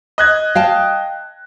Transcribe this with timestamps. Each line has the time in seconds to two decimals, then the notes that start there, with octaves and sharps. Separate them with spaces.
0.18 D#5 F#6 G#6
0.55 F5 G5 A5